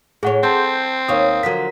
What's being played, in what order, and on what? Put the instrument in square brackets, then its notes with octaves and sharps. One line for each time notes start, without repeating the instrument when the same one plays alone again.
[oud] A2 C#5 [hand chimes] G#4 F#5
[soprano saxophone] C4 [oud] A4 [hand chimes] A5 C6 G6
[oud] D#2 C#5 [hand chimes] A#4 F5 D#6
[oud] D3 F3 F#3 [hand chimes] A#4 B6